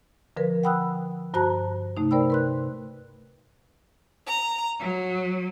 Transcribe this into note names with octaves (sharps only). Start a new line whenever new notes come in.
D3 F3 A#4 B4
F#5 G5 B5 D#6 E6 F#6
G2 F#4 C5 A5 A#5 F#6
C3 A3 D#4
A#4 C5 D5 G5 B5 E6
B4 C6 F#6
A#5
F#3